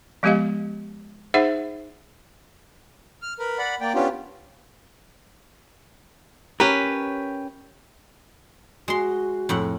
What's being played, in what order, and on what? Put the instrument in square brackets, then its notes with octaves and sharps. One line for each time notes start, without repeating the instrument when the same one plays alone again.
[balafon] F3 G#3 B3 G4 D#5 F5
D#4 G#4 C5 E5 F#5
[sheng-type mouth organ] F6
A#4 B4
D5 F#5 B5
A#3 D5 G5
B3 C#4 D4 F4 G4
[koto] C#4 B4 [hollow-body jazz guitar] G4 A#4
[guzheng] G#3 C6 [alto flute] F#4
[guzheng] F2 A2 F#5